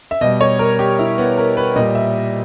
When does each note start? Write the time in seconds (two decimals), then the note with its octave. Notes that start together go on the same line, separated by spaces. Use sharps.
0.11 E5
0.21 B2 G3 D#5
0.41 C#5
0.59 A#4
0.79 G4
0.99 E4
1.18 B3
1.38 A#4
1.57 B4
1.76 A#2 G3 D#5
1.95 E5